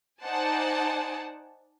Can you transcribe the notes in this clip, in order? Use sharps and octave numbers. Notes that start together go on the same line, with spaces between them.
D#4 C5 D5 F#5 G#5 A5